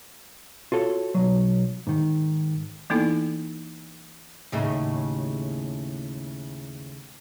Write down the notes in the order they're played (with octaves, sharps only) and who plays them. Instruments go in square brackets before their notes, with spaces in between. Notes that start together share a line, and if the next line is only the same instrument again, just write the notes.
[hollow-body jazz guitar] F4 F#4 A4 C#5
B1 F#3
G#2 D#3
[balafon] E3 A#3 B3 D#4 E4 A4
[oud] D#2 A2 C#3